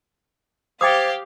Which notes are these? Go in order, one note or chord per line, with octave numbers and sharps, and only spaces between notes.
G4 C5 F5 G5 D6 D#6 G#6 A6